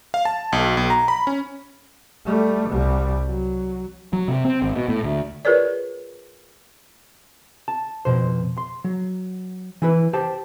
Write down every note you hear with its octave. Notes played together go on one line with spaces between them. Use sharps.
F5
A5
B1
B1
A#5
B5
C#4
G3 A3
C2 G3
F#3
F#3
C3
C4
G#1
B2
A2
D2
F4 G#4 A#4 B4 C#5 D5
A5
F2 B2 C5
C6
F#3
E3 E4 B4
G4 C5 G5 A5